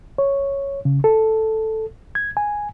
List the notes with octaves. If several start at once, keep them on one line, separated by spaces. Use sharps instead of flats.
C#5
C#3
A4
G#6
G#5